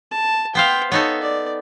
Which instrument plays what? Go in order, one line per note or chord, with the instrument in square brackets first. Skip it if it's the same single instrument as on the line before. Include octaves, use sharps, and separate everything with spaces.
[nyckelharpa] A5
[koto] B3 C5 F5 [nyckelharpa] G5
[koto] B3 D#4 A4 [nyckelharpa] C#5
[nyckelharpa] D5